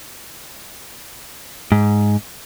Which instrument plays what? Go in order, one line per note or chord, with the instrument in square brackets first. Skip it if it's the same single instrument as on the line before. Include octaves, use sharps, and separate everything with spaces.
[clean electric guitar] G#2